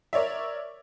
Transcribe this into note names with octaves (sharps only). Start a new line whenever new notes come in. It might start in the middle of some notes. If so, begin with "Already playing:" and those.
A#4 C#5 D5 E5